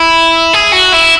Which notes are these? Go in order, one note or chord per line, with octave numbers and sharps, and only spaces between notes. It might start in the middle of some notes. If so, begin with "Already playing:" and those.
Already playing: E4
G#4
F#4
E4